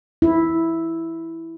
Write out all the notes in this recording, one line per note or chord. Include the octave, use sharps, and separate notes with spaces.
E4